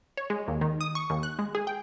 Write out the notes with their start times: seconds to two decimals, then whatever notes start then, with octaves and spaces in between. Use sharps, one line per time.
0.17 C#5
0.30 G#3
0.48 D#2
0.61 D#3
0.81 D#6
0.95 C#6
1.10 D#2
1.23 F#6
1.39 G#3
1.55 G#4
1.67 G5